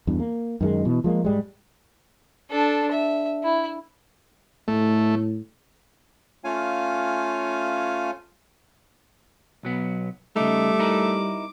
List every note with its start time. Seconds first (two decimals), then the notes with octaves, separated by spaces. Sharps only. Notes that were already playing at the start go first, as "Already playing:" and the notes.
0.07 E2 G2
0.20 A#3
0.61 F#2 D#3 G#3
0.85 B2 E3
1.04 F3 G#3 A#3
1.25 G#2 G3 G#3
2.50 D4 A4
2.91 E5
3.43 E4
4.68 A2 A3
6.44 A3 C#4 F4 C#5 F5 G#5
9.63 B1 F#3 B3
10.36 C#3 G3 A3 D#4 D6
10.79 D#4 E4 A#4